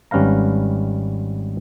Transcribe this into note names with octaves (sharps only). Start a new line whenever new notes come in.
G#1 G3 C#4 B4 F5 A#5